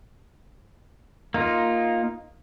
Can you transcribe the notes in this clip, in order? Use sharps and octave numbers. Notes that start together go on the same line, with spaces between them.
A#3 D#4 F4